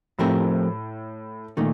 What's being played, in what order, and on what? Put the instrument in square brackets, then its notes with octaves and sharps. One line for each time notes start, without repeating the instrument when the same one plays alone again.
[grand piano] A2 [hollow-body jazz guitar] F3 A3 C4 G4 A#4
[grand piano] A#2 [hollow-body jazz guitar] D#3 A3 D#4